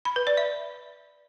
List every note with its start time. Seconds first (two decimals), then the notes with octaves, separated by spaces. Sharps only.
0.05 B5
0.16 B4
0.27 D5
0.37 E5